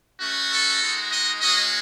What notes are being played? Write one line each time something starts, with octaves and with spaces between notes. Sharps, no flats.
A3 C#4 F#4
A4
G#3 D#4 F#4
D#5
G#3 C#4 F#4 D#5